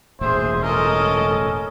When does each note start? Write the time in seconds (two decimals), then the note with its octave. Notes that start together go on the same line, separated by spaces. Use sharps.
0.21 E1 A1 A#2 G#4 C5 E5
0.63 C#4 A4 A#4 D#5